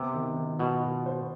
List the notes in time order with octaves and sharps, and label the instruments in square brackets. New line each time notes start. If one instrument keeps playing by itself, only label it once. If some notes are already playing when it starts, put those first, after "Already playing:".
Already playing: [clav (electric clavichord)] C3 [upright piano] B3
[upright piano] D#3
D#3
[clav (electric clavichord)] B2 [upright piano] F4
[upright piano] F4
C5